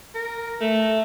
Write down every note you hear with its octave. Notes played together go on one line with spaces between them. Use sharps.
A#4
A3